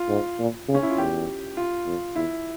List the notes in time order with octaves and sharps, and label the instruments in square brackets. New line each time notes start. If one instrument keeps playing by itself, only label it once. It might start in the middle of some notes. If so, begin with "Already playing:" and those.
Already playing: [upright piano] F4
[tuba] G#2
A#2
C#3
[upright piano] C#4
E4
F4
[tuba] E2 [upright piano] G4
[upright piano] F4
[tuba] F2
[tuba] E2 [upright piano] E4